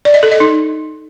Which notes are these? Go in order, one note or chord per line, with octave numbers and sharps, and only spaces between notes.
D5
D#5
A4
D#5
D#4